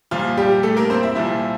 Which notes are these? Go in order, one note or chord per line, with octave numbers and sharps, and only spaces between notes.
C2 A#2 F3 F4
G3 G4
A3 A4
A#3 A#4
C4 C5
E4 E5
C2 A#2 F3 E4 E5